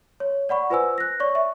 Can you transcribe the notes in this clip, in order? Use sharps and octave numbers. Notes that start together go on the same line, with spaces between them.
C#5
D5 F#5 B5 C#6
F4 B4 C5 G#5 E6
F#6 A#6
C#5 D5 C#6
E5 C#6